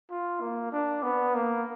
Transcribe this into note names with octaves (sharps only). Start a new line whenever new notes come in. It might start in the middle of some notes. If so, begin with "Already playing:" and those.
F4
A#3
D4
B3
A#3